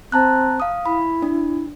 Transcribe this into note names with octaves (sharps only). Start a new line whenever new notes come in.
C4 A5 A#5 F#6
F5 D#6
E4 B5
D4